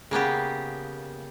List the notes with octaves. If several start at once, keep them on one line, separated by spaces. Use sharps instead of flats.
C#3 A#3 B3 G4